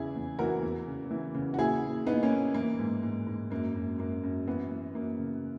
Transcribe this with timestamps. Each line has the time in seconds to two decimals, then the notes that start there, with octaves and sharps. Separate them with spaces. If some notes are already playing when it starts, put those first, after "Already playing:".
Already playing: E2 C#3 E4 G#4
0.16 E2
0.39 E3 F#4 A#4
0.63 E2
0.88 C#3
1.11 E3
1.35 C#3
1.54 F#4
1.59 A#2 E4 G#4
1.84 A#2
2.06 A#2 B3 D#4
2.23 A#3 C#4
2.31 A#2
2.54 E3 A#3
2.79 G#2
3.03 G#2
3.27 G#2
3.50 F#2 A#3
3.76 F#2
3.98 F#2 A#3
4.23 F#2
4.47 E3 B3
4.71 E3
4.95 F#2 A#3
5.19 C#3